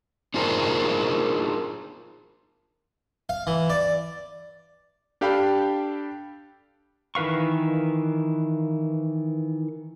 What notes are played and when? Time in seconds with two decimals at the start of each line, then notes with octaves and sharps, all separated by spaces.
0.34 D4 D#4 F4 G#4 A#4 C5
3.29 F5
3.47 E3
3.70 D5
5.21 D4 G4 A4 F5 G5 B5
7.15 D#3 E3 B4 F5 C#6